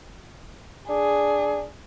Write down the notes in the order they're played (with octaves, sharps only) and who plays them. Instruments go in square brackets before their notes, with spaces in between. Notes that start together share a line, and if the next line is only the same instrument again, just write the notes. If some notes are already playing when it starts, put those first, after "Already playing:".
[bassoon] D4 [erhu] G#4